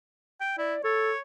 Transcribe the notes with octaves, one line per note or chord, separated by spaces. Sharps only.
G5
E4 D5
A4 C#5